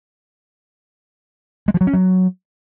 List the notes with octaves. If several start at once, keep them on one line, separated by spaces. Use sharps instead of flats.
G#3
F3
F#3
C#4
F#3